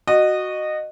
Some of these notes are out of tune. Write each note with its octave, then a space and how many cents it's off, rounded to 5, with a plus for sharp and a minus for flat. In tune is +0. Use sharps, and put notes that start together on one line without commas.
F#4 +0 D#5 -20